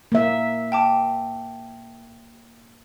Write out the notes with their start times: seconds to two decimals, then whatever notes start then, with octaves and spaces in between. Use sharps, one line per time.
0.12 A#3 E5
0.72 G5 A5 D6